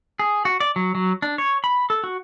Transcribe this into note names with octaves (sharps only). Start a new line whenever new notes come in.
G#4
F#4
D5
F#3
F#3
D4
C#5
B5
A4
F#4